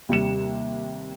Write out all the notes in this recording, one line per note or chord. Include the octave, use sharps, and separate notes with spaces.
D#2 C3 G3 C#7 E7